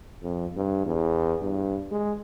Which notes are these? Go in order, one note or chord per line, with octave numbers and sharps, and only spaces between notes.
F2
G2
E2
G2
G#3